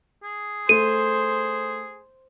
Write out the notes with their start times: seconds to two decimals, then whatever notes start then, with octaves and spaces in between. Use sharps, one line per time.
0.23 G#4
0.69 A3 C5 D#7